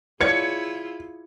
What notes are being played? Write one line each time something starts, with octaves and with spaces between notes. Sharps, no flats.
E4 F4 G#4 B4 C#5 D5 G#6 C#7